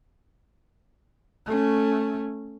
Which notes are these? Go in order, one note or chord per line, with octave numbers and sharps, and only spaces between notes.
A3 C#4